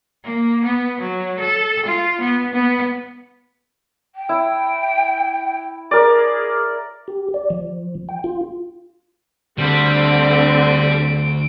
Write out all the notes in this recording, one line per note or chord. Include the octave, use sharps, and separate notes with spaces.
A#3
B3
F#3
A4
F4
B3
B3
G5
E4
G#4 A#4 D5
G4
D5
F3
G5
F4
D2 D3 G3 C4 D7